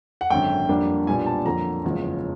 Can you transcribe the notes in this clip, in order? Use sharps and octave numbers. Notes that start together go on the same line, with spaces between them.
F#5
G#1 F#2 D3 G5
F2 D3 G3 A#3 D4
B1 A#2 G3 B3 D4 G#5
A5
F2 D3 F#3 A#3 A#5
F#1 E2 C#3 F3 G#3